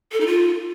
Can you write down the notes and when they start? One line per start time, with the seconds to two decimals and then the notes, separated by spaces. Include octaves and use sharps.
0.12 A4
0.21 D#4
0.27 F4